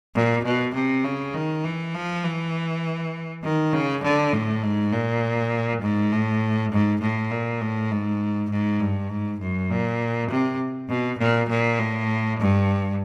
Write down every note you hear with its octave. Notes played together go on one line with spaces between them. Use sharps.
A#2
B2
C3
C#3
D#3
E3
F3
E3
D#3
C#3
D3
A2
G#2
A#2
G#2
A2
G#2
A2
A#2
A2
G#2
G#2
G2
G#2
F#2
A#2
C3
B2
A#2
A#2
A2
G2